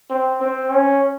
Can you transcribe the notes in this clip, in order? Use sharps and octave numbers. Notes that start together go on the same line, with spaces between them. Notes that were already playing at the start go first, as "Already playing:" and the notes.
C4
C4
C#4